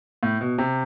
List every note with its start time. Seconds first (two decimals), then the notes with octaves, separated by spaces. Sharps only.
0.23 A2
0.41 B2
0.58 C3